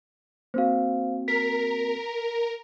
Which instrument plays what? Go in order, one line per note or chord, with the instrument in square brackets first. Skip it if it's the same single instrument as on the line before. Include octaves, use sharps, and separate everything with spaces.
[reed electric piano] A#3 C4 F#4 [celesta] C5 F5
[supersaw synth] A#4 [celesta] B6